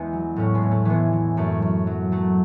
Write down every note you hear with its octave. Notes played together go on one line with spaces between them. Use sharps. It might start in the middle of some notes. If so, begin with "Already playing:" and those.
Already playing: E2 G#3 B3
F#3
A2 A3 C#4
G#3 B3
A2
A3
E3 G#3 B3
E3
F#2 A3
F#2
F#3
F#3 A3